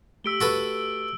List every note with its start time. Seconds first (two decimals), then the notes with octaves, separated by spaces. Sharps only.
0.24 A3 G4 E6 B6 D7 G7
0.41 F#4 A4 B4